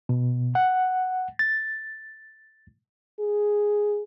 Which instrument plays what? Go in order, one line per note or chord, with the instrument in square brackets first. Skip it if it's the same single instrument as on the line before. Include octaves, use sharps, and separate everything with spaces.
[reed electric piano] B2
F#5
A6
[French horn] G#4